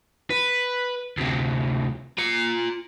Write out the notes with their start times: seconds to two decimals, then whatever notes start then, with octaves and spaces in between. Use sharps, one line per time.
0.30 B4
1.18 D2 C3
2.18 F4 A#5